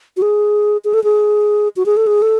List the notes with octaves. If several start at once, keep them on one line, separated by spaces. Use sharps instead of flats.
F#4
G#4
G#4
A4
G#4
F#4
G#4
A4
G#4
A4